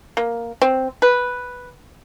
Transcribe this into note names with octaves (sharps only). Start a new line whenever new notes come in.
A#3
C4
B4